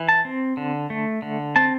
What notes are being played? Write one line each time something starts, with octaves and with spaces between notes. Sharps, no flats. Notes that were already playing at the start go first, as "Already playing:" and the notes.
Already playing: E3
A5
C4
D3
A3
D3
C4 A5